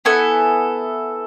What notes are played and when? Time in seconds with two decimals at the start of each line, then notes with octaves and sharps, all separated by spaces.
0.05 B3 E4 A4 G#5